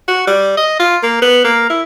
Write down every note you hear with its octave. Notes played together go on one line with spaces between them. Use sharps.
F#4
G3
D#5
F4
A#3
B3
A#3
E4